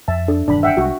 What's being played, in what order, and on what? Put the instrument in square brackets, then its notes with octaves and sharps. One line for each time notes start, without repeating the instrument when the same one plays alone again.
[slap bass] F2 [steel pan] E5 A5
[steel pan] D4 A4
[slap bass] E1 G2 D#3 [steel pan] D4 B5
[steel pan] E5 F#5 G5
[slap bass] C2 G3 G#3 [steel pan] F#4